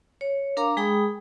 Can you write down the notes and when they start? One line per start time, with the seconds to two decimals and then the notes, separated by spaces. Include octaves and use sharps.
0.21 C#5
0.57 D4 A#4 F5 A#5 D6
0.77 G#3 G#4 G5 B5 D#6